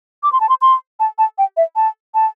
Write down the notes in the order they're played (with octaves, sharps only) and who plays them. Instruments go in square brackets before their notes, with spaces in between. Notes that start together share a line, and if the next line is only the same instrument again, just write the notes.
[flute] D6
C6
A5
C6
C6
A5
A5
G5
E5
A5
A5